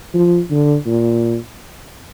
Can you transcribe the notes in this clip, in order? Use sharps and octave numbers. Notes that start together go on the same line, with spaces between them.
F3
D3
A#2